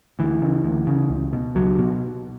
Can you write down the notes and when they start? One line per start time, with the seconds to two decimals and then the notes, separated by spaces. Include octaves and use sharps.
0.19 D2 E3
0.42 C#3
0.64 D2
0.87 C#3
1.10 C#2
1.33 B2
1.55 C#2 F#3
1.79 B2